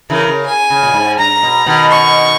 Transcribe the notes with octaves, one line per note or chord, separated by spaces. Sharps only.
C#3 E3 A#4
C#3
G#5
C#3
A#2
G#2
G2 A#5
B2
B2 D#3
C#6